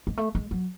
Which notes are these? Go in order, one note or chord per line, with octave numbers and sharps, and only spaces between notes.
G#3
A3
G#3
F#3